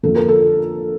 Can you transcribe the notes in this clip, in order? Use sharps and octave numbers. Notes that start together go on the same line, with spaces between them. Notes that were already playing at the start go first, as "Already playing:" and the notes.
F2 D3 F3 A#3 D4 A4
A#4
A4